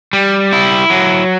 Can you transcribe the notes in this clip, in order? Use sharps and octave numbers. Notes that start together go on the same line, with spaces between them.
G3
E4
F#3